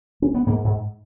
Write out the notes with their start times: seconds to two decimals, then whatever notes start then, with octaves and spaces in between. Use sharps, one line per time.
0.22 C#4
0.34 B3
0.46 G#2 A#3
0.64 G#2